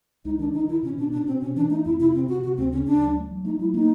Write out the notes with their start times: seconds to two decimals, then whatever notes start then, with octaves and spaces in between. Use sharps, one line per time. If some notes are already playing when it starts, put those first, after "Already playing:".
0.25 C#2 D#4
0.39 D#3 D4
0.54 D#3 D#4
0.68 D#3 E4
0.83 B2 C#4
0.98 B2 D4
1.12 B2 D4
1.27 B2 C4
1.41 C3 C#4
1.56 E3 D4
1.70 A3 D#4
1.85 F2 E4
2.00 C3 E4
2.14 C3 C4
2.28 C3 F#4
2.43 C3 F#4
2.57 D2 C4
2.73 C#3 C#4
2.87 D2 D4
3.01 F#3
3.16 A3
3.31 F#3
3.45 A3 D#4
3.59 F#3 E4
3.74 A#3 D#4